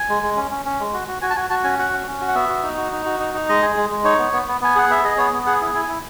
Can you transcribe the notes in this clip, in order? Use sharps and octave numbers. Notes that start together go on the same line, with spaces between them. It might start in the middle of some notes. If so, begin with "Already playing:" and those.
Already playing: G#5
G#3
G#3
C#4
C#4
C#4
G#3
F#4
F#4
F#4 G#5
A5
F#4 G#5
F#4 A5
C#4 G#5
F#4 F#5
C#4
C#4
F#4
F#5
B3 E5
F#4
D#4
F#4
D#4
F#4
D#4
D#4
G#3 D#5
G#4
G#3
G#3
D#4 C#5
B3
B3
B3
B3 G#5
G#4 F#5
B3 E5
G#4 D#5
B3 C#5
B3
G#4 F#5
E4
E4 G#5
E4